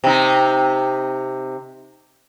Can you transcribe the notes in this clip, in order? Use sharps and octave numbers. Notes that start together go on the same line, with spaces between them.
C3 D#4